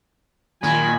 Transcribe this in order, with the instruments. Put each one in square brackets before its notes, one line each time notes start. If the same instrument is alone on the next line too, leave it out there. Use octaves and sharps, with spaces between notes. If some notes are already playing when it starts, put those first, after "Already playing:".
[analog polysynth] A#2 D#3 [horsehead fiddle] G#5 B5